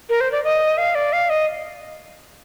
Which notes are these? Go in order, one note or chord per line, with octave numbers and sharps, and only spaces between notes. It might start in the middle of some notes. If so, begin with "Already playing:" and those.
A#4
C5
D5
D#5
F5
D5
F5
D#5